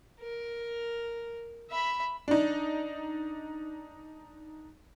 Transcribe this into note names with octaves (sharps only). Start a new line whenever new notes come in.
A#4
E5 B5
D4 D#4